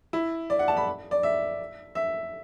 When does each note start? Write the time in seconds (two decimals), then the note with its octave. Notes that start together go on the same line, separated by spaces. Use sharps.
0.13 E4
0.50 D5
0.59 F#5
0.68 A5
0.77 B5
1.11 D5
1.23 E5
1.95 E5